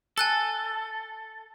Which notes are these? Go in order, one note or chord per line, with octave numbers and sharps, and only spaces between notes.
A4 G#5 F#6 A6